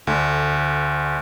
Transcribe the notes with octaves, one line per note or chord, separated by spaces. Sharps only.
D2 D3